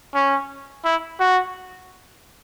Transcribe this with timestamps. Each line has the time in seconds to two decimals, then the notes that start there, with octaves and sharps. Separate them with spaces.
0.14 C#4
0.85 E4
1.20 F#4